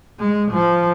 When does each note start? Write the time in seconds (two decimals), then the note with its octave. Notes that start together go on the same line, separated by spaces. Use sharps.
0.19 G#3
0.51 F3